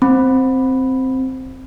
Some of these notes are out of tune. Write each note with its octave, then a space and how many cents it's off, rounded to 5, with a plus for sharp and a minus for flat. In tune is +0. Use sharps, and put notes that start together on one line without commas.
C4 +0 B5 +0